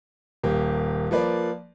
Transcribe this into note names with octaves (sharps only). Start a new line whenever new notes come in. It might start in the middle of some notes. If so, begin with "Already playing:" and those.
D#1 A#3 G4
F3 A#3 B4 D5